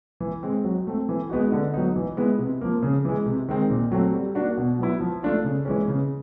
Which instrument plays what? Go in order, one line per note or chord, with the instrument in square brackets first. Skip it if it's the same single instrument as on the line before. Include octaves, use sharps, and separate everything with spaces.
[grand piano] E3
G#3 C4
F#3
A3 C4
E3
G#3 B3 D#4 F#4
D3
F#3 B3 D#4
E3
G#3 B3 E4
C3
F3 A#3
C#3
E3 G#3
C3
D#3 G#3 C4
A#2
F#3 A3 C4
G3
A#3 D4 F#4
B2
F#3 B3 E4
F3
A3 D4 F4
C#3
E3 G#3 C#4
C#3